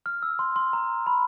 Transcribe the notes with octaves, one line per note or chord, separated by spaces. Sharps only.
F6
E6
C6
C6
A#5
B5